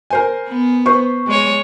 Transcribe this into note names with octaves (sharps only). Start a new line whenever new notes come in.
A#4 C5 G#5
B3
B4 C5 C#6
G#3 C#5